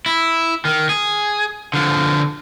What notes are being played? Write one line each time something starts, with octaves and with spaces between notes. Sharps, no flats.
E4
D#3
G#4
D3 F3